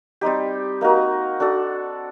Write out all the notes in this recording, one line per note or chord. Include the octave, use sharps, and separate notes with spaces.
G3 C4 D#4 G4
A#3 D#4 F#4 A#4
D4 F#4 A4 D5